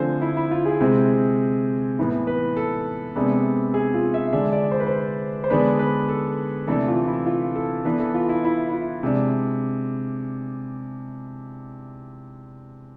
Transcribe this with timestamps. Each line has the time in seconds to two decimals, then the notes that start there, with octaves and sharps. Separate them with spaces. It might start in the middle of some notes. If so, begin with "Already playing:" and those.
Already playing: D3 F3 A3 C4 C5 G#5
0.21 E4
0.37 E4
0.51 F4
0.66 G#4
0.80 C3 G#3 C4
1.99 A2 E3 B3
2.27 B4
2.57 A4
3.16 C3 G#3 B3 D4
3.74 G#4
3.94 F4
4.14 E5
4.33 D3 G#3 D4 E5
4.53 D5
4.72 C5
4.80 B4
4.87 C5
5.44 C5
5.50 D3 G#3 B3 D4 B4
5.79 B4
6.09 A4
6.67 C3 E3 A3 D4 A4
6.88 F4
7.07 E4
7.26 F4
7.55 A4
7.85 E3 B3 D4 B4
8.00 A4
8.14 F4
8.29 E4
8.44 E4
8.69 E4
8.73 F4
9.03 C3 G#3 D4